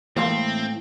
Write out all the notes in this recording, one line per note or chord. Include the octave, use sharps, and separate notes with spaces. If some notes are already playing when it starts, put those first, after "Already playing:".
A2 E3 G#3 A#3 C4 F5 C6